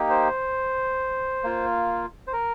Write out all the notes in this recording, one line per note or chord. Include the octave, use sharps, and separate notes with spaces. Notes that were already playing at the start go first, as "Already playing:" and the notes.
Already playing: A#3 D#4 G4
C5
A#3 F4
C5
A#4